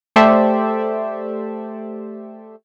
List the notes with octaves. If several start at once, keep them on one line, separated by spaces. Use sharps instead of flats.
A3 G4 A4 C5 D5 E5